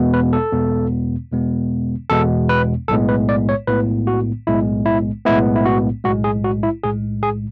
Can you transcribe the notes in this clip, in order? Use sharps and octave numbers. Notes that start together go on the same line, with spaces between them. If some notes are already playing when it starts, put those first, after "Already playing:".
Already playing: E2 B2 G#3 B3
B4
A4
E2 B2 G#3 B3
E2 B2 G#3 B3
E2 B2 G#3 B3 A4
B4
B1 A2 G#3 B3 A4
B4
D5
C#5
B1 A2 G#3 B3 B4
F#4
B1 A2 G#3 B3 E4
E4
B1 A2 G#3 B3 E4
E4
F#4
B1 A2 G#3 F#4
G#4
F#4
E4
B1 A2 G#3 G#4
G#4